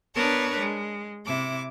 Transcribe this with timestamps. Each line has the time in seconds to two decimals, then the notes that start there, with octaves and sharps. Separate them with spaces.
0.14 B3 D4 A#4 B4 C#5 A5
0.60 G#3
1.24 C3 E4 D6